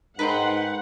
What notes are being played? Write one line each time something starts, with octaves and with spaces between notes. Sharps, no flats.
G#2 D#4 A#4 B4 F#5 G5 A#5 C6